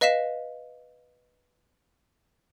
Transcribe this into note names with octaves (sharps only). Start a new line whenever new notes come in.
B4 D#5 F5 B6 E7